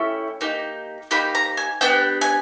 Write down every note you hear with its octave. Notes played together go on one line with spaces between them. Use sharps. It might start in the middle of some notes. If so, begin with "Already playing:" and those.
Already playing: A3 C#4 E4 G4
A#3 D#4 G4
A#3 D#4 G4 B5
A#5
G#5
B3 D4 G4 G5
G#5